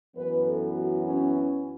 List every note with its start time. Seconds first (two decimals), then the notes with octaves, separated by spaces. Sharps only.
0.15 F#2 E3 B3 B4
0.45 A4
0.76 F#4
1.05 C#4